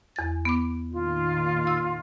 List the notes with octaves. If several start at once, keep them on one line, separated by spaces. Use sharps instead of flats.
E2 A6
B3 D6
A#2 D#3 F4
E6